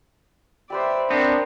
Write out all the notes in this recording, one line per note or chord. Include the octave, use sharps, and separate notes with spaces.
G4 B4 C5 D5 E5
B3 C4 D4 A#4